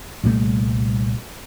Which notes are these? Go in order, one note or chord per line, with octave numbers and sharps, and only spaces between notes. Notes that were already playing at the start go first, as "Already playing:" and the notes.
C2 A#2 G3 A3